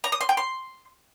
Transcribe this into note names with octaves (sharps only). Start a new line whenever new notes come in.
A#5
D#6
C6
G5
C6